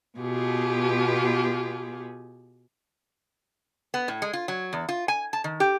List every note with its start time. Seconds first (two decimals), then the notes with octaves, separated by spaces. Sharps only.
0.19 B2 B3 F4 G4 G#4
3.94 B3
4.08 A2
4.22 G#3
4.33 F4
4.48 F#3
4.73 E2
4.89 F4
5.08 G#5
5.33 A5
5.44 D#3
5.60 G4